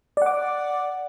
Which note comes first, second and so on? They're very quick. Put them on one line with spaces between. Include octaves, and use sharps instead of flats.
D5 F#5 D6